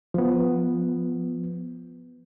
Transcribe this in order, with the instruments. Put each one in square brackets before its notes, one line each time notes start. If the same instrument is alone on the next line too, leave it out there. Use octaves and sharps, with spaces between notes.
[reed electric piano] F3 B3